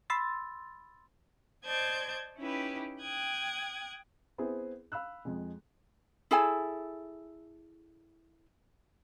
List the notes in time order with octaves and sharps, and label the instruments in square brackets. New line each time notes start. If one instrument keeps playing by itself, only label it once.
[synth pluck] B5 C6 E6 A6
[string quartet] C5 D5 D#5 A5 G6 G#6
C#4 D#4 E4 G4 B4
G5 D#6 F#6 G#6
[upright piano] B3 C4 E4 G#4
F5 B5 E6 F#6
F2 G#3
[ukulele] E4 G#4 A4 G#5